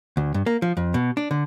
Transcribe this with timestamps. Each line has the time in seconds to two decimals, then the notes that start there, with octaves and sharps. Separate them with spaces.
0.17 D2
0.34 G2
0.46 A#3
0.62 F3
0.77 F2
0.94 B2
1.17 D4
1.31 D3